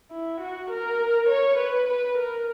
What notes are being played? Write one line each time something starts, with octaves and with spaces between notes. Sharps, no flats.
E4
F#4
A#4
C#5
B4
B4
A#4